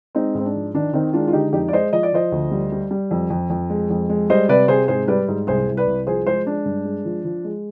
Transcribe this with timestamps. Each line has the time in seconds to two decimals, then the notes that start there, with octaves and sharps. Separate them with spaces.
0.15 G#3 C4 D#4
0.35 G#2 C4
0.45 D4
0.55 F3
0.74 D#3 D4
0.93 D#3 C4 D#4
1.13 G#3 D4 F4
1.28 F4
1.33 D3 D#4 G4
1.53 F2 D#4 G4
1.68 D5
1.73 G#3 C5 D#5
1.93 F3 D#5
2.03 D5
2.13 F3 C5 D#5
2.32 D2
2.51 G3
2.72 G3
2.91 G3
3.11 F2
3.30 F2
3.50 F2
3.70 G#3
3.90 F2
4.09 G#3
4.30 G3 C5 D#5
4.49 C3 B4 D5
4.68 C3 G#4 C5
4.88 G#2 G#4 C5
5.08 G3 B4 D5
5.28 G#2
5.47 C2 G#4 C5
5.67 C2
5.77 B4 D5
5.87 C2
6.07 F3 G#4 C5
6.26 G#3 G#4 C5
6.46 G#3 D4
6.65 G2
6.85 G#3
7.05 F3
7.25 F3
7.44 G#3